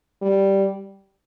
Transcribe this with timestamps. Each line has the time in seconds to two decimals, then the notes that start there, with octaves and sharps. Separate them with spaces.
0.22 G3